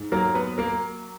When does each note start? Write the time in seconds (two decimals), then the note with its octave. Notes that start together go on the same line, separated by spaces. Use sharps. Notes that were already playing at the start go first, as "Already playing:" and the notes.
Already playing: G#2
0.12 F#3 A#3 A#4
0.35 B3 B4
0.58 A#3 A#4